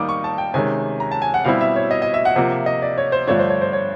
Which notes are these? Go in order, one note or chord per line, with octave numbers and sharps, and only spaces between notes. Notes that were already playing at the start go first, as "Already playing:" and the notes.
Already playing: D#3 G3 A#3 D#4 D6 D#6
C#6
A5
G5
C3 D#3 G#3 C#4 G#5
A#5
A5
G#5
F#5
B2 G3 C4 E4 F5
E5
C#5
D#5
D#5
E5
F#5
C3 F3 A#3 F#5
E5
D#5
D5
C#5
C5
G2 D3 F3 A3 D4 C#5
C5
C#5
C5
C#5